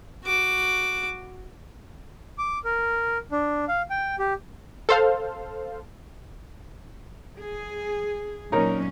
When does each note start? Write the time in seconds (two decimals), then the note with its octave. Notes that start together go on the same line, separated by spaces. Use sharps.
0.25 F#4 D6
2.38 D6
2.65 A#4
3.32 D4
3.68 F5
3.90 G5
4.19 G4
4.89 A4 C5 F5
7.39 G#4
8.52 A#2 F#3 C#4 D#4 A#4 C#5